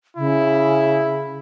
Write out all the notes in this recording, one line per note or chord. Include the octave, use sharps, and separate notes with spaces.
C#3 E4